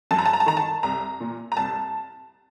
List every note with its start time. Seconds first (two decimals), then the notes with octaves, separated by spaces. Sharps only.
0.11 F#2 A5
0.18 A#5
0.25 A5
0.33 A#5
0.40 A5
0.46 D#3 A#5
0.57 A5
0.83 C2 A#5
1.20 A#2
1.52 A#5
1.57 C2 A5